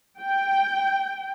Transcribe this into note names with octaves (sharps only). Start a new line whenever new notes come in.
G5